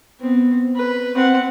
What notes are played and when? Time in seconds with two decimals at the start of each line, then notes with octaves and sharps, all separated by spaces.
0.20 B3 C4
0.76 B4
1.16 C4 F#5